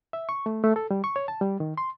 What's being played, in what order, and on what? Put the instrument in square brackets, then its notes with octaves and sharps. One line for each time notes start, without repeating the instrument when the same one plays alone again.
[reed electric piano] E5
C#6
A3
A3
A4
G3
C#6
C#5
A5
G3
D#3
C6